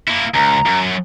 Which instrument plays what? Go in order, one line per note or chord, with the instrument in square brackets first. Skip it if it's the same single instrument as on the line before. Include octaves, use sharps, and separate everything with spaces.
[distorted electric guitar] A#3 E4
[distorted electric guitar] C#2 [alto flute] A#5
[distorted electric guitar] F#2